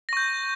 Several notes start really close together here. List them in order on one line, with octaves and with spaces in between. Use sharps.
A#6 C#6 G6